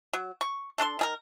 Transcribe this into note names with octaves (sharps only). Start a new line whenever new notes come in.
F#3
C#6
A3 D4 A4 C6
D#3 G#4 A#4